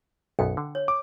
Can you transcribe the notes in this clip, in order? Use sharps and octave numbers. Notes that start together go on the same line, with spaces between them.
B1 F#2 B3 G5
D3
C#5
D6